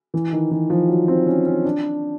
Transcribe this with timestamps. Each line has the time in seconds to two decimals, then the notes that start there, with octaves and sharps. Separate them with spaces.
0.14 E3
0.33 D#3
0.51 E3
0.70 F3
0.89 F#3
1.08 C4
1.27 C#4
1.46 C#4
1.65 D4